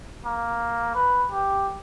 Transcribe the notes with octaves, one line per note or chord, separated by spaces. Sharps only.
A#3
B4
G4